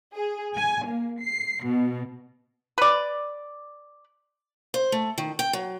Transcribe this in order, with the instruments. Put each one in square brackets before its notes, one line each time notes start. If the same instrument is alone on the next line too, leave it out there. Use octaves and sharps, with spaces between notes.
[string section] G#4
G#5
A#3
C7
B2
[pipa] B4 D5
[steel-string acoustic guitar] C5
A3
D#3
G5
F#3